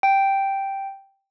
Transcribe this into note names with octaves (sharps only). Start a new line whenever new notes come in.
G5